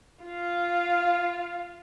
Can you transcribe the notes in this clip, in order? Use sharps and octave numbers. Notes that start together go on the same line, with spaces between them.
F4 F5